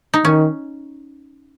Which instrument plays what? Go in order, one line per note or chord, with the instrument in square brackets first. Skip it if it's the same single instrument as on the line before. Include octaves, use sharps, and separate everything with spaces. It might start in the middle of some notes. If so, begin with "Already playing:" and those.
[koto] D#4
[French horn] D#3 [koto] C#4